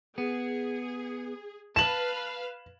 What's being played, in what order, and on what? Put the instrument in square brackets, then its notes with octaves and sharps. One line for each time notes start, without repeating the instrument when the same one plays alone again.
[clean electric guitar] B3 [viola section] G#4
[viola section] B4 F5 [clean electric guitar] A5 [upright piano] E7 F#7